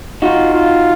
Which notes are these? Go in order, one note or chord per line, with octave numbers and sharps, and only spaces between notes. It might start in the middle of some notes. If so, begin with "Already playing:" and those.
D#4 F4 F#4
F4